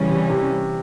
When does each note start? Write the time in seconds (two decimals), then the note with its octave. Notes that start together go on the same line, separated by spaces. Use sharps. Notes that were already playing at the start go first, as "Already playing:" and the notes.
Already playing: C#3 E3 G3 C#4
0.10 C3
0.30 C3